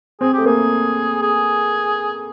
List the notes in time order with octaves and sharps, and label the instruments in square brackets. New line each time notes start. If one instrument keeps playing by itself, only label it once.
[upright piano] C4 [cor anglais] G#4
[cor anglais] G4
[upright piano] A3
[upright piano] A#3 [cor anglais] G#4
[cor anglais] G#4